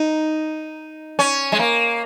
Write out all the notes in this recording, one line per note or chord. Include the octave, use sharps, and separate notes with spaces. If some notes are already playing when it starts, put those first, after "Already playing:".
Already playing: D#4
C#4
G#3
A#3